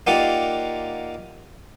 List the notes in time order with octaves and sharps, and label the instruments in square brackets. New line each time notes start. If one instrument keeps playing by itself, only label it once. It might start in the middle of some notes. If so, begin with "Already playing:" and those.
[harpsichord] A#3 D#4 F4 G4 D5 F#5